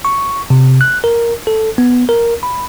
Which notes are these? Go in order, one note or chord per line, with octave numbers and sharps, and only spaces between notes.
C#6
C3
F#6
A#4
A4
B3
A#4
B5